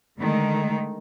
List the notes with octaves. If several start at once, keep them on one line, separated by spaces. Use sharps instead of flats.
D3 D#3 G#3 A3